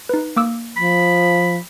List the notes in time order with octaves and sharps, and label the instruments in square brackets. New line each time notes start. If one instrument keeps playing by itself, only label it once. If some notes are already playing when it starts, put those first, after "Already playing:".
[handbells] D#4 B4
A#3 D6 E6
[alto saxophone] F3 [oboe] B5